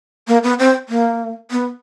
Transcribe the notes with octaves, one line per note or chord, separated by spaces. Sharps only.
A#3
B3
C4
A#3
B3